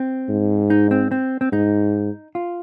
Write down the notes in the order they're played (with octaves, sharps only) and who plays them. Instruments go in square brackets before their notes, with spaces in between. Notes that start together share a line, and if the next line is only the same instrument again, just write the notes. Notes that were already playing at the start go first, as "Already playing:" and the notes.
Already playing: [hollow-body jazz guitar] C4
[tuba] G#2
[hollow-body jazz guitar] D#4
C4
C4
C4
[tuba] G#2 [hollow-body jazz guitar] D#4
[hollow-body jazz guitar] F4